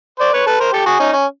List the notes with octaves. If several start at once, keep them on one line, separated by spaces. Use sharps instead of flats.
C5 D5
B4 C#5
A4 B4
A#4 C5
G4 A4
F#4 G#4
C#4 D#4
C#4